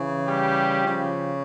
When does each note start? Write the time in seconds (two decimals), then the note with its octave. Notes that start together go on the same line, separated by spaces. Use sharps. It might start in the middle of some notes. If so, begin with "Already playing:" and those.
Already playing: C#3 E3
0.27 G3 G4
0.82 C#3 F3